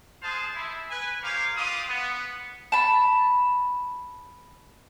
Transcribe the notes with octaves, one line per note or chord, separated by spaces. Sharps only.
G#3 G#4 C5 F5 A5
E4
B4 G#5
G4 A#4 C5 C#5 F5
F4 G4 B4 D5 D#6
B3
A5 B5